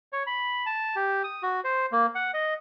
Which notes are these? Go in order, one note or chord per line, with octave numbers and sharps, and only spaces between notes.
C#5
B5
A5
G4
D#6
F#4
C5
A#3
F#5
D#5